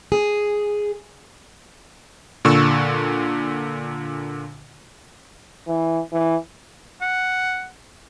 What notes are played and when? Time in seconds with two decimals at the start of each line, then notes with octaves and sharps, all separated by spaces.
0.12 G#4
2.45 A#2 D3 C#6 E6
5.68 E3
6.12 E3
7.01 F#5